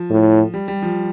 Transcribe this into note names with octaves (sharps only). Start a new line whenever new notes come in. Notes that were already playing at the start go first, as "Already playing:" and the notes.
Already playing: F3
A2
G3
G3
F3